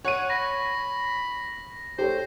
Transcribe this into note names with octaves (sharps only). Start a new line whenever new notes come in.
C#5 F#5 D#7
B5 A#6
G4 A4 C5 C#5